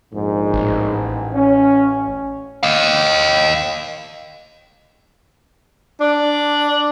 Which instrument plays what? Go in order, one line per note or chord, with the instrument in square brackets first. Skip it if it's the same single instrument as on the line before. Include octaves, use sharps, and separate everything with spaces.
[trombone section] A#1 F2 G#2
[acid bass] A1
[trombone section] C#4
[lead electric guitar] D#5 F5
[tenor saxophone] D4